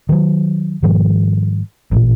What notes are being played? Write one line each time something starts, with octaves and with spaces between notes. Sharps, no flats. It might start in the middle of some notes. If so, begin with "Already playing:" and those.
D#3 F#3
G#2 D#3 F3 G3
A1 A#2